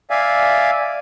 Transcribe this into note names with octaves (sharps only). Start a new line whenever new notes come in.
D5 E5 F5 G#5